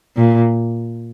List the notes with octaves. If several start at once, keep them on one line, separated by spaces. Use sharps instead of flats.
A#2